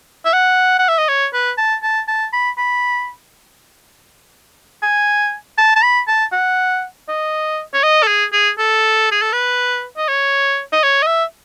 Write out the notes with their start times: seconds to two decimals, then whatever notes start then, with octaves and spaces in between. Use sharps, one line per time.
0.25 E5
0.33 F#5
0.79 F#5
0.88 E5
0.98 D#5
1.09 C#5
1.34 B4
1.58 A5
1.83 A5
2.08 A5
2.33 B5
2.58 B5
4.82 G#5
5.58 A5
5.76 A5
5.83 B5
6.08 A5
6.32 F#5
7.08 D#5
7.74 C#5
7.83 D#5
8.03 A4
8.08 G#4
8.32 G#4
8.58 A4
9.11 G#4
9.22 A4
9.33 B4
9.97 D#5
10.08 C#5
10.73 D#5
10.83 C#5
11.02 D#5
11.07 E5